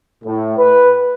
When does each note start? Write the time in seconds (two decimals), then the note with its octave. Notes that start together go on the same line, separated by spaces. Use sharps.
0.24 A2
0.58 B4